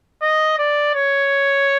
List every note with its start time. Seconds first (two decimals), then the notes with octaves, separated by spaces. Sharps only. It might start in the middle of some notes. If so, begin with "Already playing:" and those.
0.22 D#5
0.58 D5
0.95 C#5